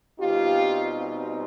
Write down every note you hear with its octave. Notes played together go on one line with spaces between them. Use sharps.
B2 G3 C4 D#4 F4 G4